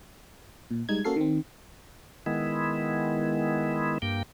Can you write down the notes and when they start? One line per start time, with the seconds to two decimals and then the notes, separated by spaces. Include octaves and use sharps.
0.71 A#2
0.89 G3 G#3 D#4 G#6
1.05 A#3 C#4 F#4 A4 F5 C7
1.16 D#3 C4
2.26 D#3 G#3 B3 E4
4.02 G2 A#3 G5